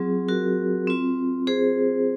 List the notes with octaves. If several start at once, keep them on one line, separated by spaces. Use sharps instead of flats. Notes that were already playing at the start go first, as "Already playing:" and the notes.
Already playing: F#3 C4 F4 G#4
F#4 A#4
C4 F4
G#4 C5